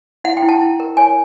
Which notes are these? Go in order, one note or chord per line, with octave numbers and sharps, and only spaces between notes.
E4 F#5
G5
E4
A5
E4
A#4
C#5 G#5